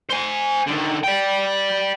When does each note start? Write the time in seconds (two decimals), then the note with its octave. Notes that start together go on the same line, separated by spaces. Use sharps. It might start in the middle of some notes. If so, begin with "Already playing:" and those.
0.10 C5 G#5
0.67 D3 D#3
1.03 D5 G5